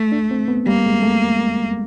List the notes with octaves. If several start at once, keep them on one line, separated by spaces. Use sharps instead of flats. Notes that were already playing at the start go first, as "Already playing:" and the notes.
Already playing: A3
D4
C4
B3
G3 A#3
G#3
A3